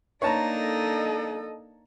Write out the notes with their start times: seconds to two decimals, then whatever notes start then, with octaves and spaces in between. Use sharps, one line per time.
0.22 A#3 D4 D#4 C#5 A5 A#5
0.56 A4 D#5